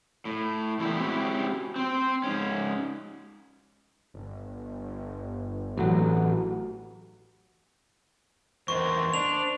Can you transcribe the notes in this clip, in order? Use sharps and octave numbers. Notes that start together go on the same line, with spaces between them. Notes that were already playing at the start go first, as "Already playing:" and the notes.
A2
E2 A#2 G3 E4
G#3 C4 C#4 E4 F#4 G4
C4 C5
G#2 C#4
G1
A1 F#3
E2 A#4 C5 D#5 C#6
D4 F7